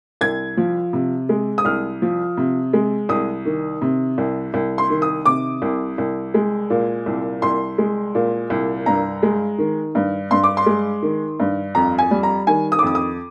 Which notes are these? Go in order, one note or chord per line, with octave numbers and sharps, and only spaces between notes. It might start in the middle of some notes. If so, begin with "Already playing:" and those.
C2 G#6
F3
C3
G#3
D#6
C2 F6
F3
C3
G#3
C2 D#6
D#3
C3
C2
C2
C6
D#3
D#6
C3 D6
C2
C2
G#3
A#2
C2
C2 C6
G#3
A#2
C2
G2 A#5
G#3
D#3
G2
G2 C6
D6
C6
G#3
D#3
G2
F2 A#5
G#5
G3
A#5
D#3 G#5
D#6
D6
F2 D#6
D#6